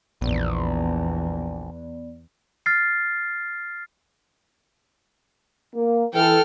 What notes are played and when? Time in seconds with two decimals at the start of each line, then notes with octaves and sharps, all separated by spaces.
0.21 A#1 E2 B3 D5
2.66 F6 A6 C7
5.74 A#3
6.13 E3 A4 G5 F6